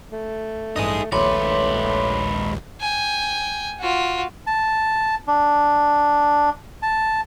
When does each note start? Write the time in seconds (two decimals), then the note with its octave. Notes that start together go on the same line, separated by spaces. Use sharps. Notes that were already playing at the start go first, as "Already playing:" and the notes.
0.12 A3
0.76 A1 G2 D#4 G#4 D#6
1.12 A#1 D#2 G#2 A3 B4 C#5 C6 D6
2.81 G5 G#5
3.79 F4 F#4
4.47 A5
5.28 D4
6.82 A5